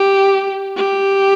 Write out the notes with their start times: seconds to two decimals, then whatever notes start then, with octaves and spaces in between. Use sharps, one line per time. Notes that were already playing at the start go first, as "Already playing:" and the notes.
Already playing: G4
0.77 G4